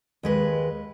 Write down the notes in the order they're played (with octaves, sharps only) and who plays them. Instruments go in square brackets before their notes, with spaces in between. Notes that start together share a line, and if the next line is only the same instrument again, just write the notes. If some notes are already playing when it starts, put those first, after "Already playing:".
[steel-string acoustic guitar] D#2 G#3 B4